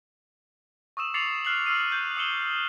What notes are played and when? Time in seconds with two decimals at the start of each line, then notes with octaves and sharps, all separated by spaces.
0.97 C#6 D#6 E6 E7
1.14 D6 A6 C7 C#7 F7 F#7
1.45 F6 F#6 C7 E7 F#7
1.66 C#6 E6 F6 C7 D#7
1.92 G6
2.17 D#6 E6 C#7 E7 F#7 G7